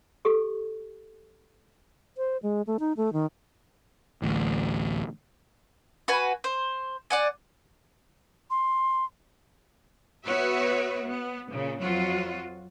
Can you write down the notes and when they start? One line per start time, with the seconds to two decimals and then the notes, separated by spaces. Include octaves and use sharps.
0.25 G4 A4 C#6
2.17 C5
2.43 G#3
2.67 A3
2.80 D#4
2.97 A3
3.13 D#3
4.22 A1 D2
6.08 F#4 B4 G#5
6.44 C5
7.10 D5 F#5 G#5
8.50 C6
10.25 B3 F#4 B4 C#5 E5
11.08 B3
11.51 A#2 C#3
11.82 F2 F#3 F4 F#4